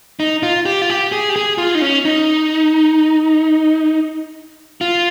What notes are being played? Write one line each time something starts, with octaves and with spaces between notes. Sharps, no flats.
D#4
F4
G4
F4
G4
G#4
G4
G#4
F4
D#4
C#4
D#4
F4